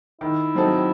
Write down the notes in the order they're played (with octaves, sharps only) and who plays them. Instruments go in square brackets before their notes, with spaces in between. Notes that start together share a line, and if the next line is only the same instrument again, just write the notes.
[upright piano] D#3 [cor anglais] E4
[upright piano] F#3 C4 D#4 A4